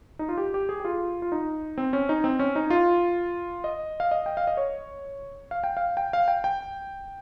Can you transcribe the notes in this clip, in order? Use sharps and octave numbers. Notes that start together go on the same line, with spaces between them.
D#4
F4
G4
G4
G#4
G4
F4
F4
D#4
C4
C#4
D#4
C4
C#4
D#4
F4
D#5
F5
D#5
G5
F5
D#5
C#5
F5
G5
F5
G5
F5
G5
G5